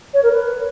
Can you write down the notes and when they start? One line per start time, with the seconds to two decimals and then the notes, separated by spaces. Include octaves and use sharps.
0.14 C#5
0.23 A#4
0.32 B4